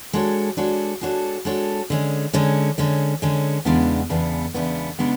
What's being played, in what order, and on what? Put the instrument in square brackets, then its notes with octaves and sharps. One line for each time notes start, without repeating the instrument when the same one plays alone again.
[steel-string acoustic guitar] G#3 D4 F#4 A4 C#5
G#3 D4 F#4 A4 C#5
G#3 D4 F#4 A4 C#5
G#3 D4 F#4 A4 C#5
D3 G#3 C#4
D3 G#3 C#4
D3 G#3 C#4
D3 G#3 C#4
E2 C#3 G#3 B3 D4
E2 C#3 G#3 B3 D4
E2 C#3 G#3 B3 D4
C#3 G#3 B3 D4